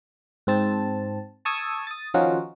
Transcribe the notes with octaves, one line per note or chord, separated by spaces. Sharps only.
G#2 C4 A5
A5 C#6 D#6 E6 G#6
D#6 A6
D#3 F3 C#4 D#4 F4 F#4